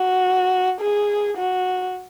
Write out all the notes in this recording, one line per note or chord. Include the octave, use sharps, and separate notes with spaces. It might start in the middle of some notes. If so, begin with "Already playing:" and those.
Already playing: F#4
G#4
F#4